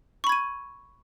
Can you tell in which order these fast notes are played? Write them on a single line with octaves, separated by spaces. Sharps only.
C#6 B5 G#6 D#7